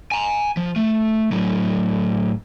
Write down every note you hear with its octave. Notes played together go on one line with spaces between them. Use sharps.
G#5 A#5
F3
A3
A2 F#3